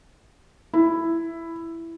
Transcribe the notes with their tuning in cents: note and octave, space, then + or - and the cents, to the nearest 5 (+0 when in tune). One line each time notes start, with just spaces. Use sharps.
E4 +5